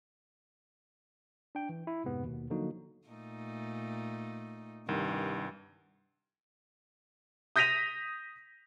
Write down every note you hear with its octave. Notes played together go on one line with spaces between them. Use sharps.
D4 G5
E3
E4
F2 G#2 C3 B3
D#2 B2
D3 F3 F#3 A#3 D#4 F#4
A#2 A3 D#4
C2 G2 D#3
D#6 G6 A#6 B6 D#7 F7